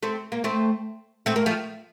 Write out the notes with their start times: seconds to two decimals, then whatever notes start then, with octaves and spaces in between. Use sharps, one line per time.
0.03 A3 C4
0.32 A#3
0.44 A3 C4
1.26 A3 C4
1.36 A#3
1.46 F3 A3